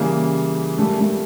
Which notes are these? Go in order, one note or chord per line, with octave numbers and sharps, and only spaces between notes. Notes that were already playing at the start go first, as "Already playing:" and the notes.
Already playing: C#3 E3 G3 A#3
A#2 G3 A3
A3